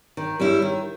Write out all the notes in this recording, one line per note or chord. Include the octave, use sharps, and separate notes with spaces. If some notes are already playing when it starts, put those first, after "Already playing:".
D#3
G3 C#4 E4
D#3